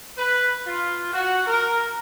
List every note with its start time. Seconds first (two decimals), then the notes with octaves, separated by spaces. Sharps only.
0.18 B4
0.66 F4
1.13 F#4
1.46 A#4